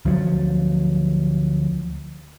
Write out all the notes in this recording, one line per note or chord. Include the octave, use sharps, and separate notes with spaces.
D2 F3 F#3